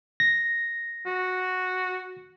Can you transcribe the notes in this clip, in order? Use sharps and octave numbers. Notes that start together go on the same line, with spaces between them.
A#6
F#4